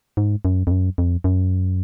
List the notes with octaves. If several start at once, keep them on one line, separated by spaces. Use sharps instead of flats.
G#2
F#2
F2
F#2
F2
F#2